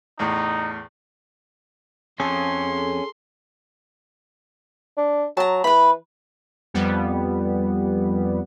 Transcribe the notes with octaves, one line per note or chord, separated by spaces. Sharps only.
E2 A2 D#4
F2 C#4 G#4 A4 C6
D4
F#3 A5 A#5
E3 B4 B5
F2 G3 B3